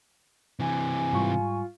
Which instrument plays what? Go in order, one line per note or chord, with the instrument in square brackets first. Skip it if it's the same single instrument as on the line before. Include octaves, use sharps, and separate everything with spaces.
[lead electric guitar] C3 E3 [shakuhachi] G#5
[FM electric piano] G#2 G3 C#6 [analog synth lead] F4